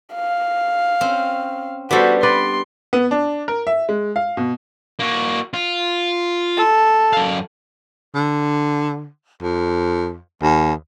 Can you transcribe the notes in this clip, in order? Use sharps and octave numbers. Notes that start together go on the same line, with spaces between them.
F5
C4 C#4
G3 B3 D4 F#4 A4 C5
B4 D5 C6
B3
D4
A#4
E5
G#3
F5
B2
A#3 F#4
F4
A4
F#2 F5
D3
F2
D#2